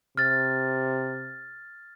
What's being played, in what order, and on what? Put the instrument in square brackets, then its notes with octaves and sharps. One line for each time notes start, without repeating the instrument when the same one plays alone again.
[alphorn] C3 [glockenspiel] F6 A6